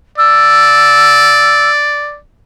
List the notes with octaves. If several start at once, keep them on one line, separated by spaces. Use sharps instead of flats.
D5 E6